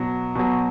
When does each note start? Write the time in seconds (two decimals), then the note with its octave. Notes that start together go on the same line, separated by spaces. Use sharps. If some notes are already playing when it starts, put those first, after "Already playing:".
Already playing: B2 F#3
0.35 B2 F#3